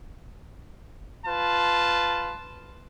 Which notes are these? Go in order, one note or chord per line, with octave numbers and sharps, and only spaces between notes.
F4 B4 A5